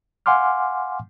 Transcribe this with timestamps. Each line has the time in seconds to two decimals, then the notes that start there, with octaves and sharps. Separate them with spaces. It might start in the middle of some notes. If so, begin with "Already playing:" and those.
0.26 F5 F#5 G#5 C6 D6 F6